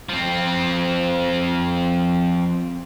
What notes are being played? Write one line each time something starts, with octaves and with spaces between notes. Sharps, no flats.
F3 C4